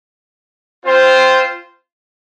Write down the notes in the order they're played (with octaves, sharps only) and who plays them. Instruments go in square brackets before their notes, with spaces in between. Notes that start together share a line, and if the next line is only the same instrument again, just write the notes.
[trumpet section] C4 F4 C5 G5